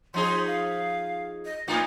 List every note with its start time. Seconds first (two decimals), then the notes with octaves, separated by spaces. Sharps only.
0.14 F3 D#4 G#4 C6
0.47 F5
1.45 D#5
1.68 A2 A#3 D#4 F4